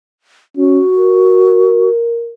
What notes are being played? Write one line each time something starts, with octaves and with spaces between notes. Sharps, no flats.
C#4 F#4
A#4